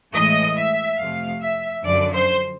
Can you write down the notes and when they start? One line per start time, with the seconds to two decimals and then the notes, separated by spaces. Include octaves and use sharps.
0.13 A2 E3 G#3 D#5
0.56 E5
0.99 F2 C3 F3 A3 F5
1.41 E5
1.84 F#2 D3 F3 D5
2.13 C5